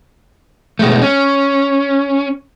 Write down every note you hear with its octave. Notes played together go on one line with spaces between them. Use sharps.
B2 G#3 A3
C#4